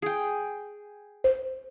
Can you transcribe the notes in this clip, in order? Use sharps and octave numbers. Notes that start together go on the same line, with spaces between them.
G#4 G5
C5